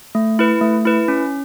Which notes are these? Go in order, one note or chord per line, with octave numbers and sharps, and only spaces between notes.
A3
E4 B4
A3
E4 B4
C#4